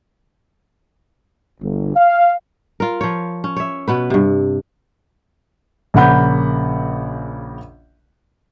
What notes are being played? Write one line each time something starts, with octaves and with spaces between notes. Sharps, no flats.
G1
F5
F4 A#4
F3 C#5
C#4
C#5 E5
B2 B3 B4
G2 C3
A#1 C#3 A#3 F#5 B5 G6